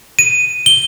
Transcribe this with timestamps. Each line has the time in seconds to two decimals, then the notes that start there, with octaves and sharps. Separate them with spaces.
0.19 D#7
0.66 G7